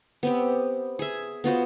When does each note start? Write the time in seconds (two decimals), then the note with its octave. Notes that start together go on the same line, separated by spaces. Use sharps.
0.23 B3 C4 G4
0.99 G#4 E5
1.44 B3 F4 F#4 C5